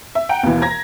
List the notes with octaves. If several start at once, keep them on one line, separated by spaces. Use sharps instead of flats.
E5
F#5 G5 A#5
D#2 B2 E3
A#5 G#6 A#6